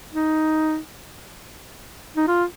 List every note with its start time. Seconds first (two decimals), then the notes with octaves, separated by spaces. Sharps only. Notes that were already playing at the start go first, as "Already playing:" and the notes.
0.13 D#4
2.16 D#4
2.28 F4